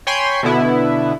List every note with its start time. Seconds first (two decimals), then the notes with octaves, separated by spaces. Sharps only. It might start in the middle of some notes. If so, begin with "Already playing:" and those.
0.07 C#5 G5 G#5 B5 C6
0.43 B2 D3 B3 E4